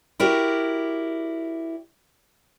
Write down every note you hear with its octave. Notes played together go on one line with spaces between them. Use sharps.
E4 F#4 G4 A#4 D5